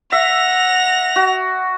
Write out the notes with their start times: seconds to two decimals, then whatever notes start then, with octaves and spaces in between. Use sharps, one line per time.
0.12 E5 F#5 A#6 F7
1.16 F#4